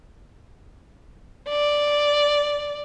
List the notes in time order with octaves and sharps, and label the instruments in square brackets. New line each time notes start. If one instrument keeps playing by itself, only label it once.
[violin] D5